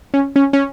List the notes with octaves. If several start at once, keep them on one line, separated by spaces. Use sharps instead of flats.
C#4
C#4
C#4